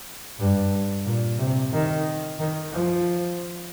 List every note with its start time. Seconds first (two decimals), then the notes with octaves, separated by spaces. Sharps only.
0.39 G2
1.06 A#2
1.39 C3
1.73 D#3
2.39 D#3
2.72 F3